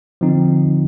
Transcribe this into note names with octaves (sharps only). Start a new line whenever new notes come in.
D3 F3 C4 D#4